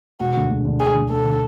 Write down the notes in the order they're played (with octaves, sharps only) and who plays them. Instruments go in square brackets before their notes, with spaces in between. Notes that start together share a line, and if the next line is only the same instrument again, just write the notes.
[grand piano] E1 [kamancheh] F#4
[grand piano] D2 D3
E1
D2 D3
[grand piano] E1 [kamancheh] G#4
[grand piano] D2 D3
[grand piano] E1 [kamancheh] A4
[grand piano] D3